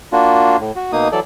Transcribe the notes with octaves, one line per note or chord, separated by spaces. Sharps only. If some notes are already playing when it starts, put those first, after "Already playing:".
A#3 D4 F4 F#4
A2
F#4
B2 A#3 D#4 D#6
E3 F#3 A4 D5